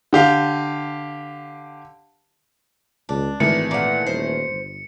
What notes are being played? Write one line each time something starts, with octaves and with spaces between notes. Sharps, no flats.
D3 G4 F5
C#2 D4
G#1 D#3 E3 A3 C#7
A#2 F#5
D#1 C5
G1